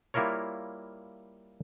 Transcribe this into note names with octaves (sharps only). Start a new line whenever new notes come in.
G3 A#3 E4 F4 A#4 C#5